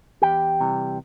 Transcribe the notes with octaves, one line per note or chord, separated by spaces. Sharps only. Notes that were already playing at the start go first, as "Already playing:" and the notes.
E2 G4 G5
C3 E3 G3